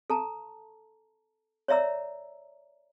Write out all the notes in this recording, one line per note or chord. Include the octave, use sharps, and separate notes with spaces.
A4 A5 A#5
C#5 D5 E5 A#5 E6